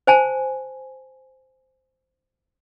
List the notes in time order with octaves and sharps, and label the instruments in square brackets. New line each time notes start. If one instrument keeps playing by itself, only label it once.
[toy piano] C5 G#5 A5